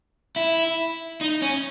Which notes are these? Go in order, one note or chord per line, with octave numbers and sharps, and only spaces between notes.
E4
D#4
C#4